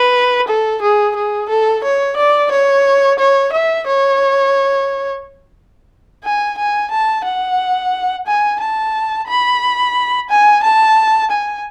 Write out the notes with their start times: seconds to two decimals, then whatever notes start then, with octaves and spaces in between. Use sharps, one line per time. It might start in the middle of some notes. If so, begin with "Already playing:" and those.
Already playing: B4
0.48 A4
0.82 G#4
1.16 G#4
1.49 A4
1.84 C#5
2.17 D5
2.51 C#5
3.19 C#5
3.53 E5
3.87 C#5
6.24 G#5
6.58 G#5
6.91 A5
7.24 F#5
8.27 G#5
8.60 A5
9.28 B5
10.29 G#5
10.63 A5
11.31 G#5